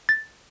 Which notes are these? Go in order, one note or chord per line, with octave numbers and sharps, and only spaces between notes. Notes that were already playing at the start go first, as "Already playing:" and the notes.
A6